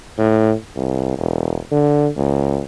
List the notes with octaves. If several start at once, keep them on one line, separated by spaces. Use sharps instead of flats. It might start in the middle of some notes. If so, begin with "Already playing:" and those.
A2
C2
E1
D3
C#2